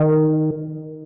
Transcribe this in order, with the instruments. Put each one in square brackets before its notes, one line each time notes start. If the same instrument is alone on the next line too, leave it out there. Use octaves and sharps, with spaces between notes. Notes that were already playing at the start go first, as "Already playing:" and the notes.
Already playing: [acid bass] D#3